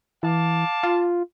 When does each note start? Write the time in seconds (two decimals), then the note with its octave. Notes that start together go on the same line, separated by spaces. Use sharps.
0.23 E3 F5 A5 D6
0.83 F4